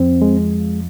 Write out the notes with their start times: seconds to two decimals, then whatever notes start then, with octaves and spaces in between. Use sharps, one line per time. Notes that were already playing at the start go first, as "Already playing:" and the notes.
Already playing: F2 C4
0.22 G#3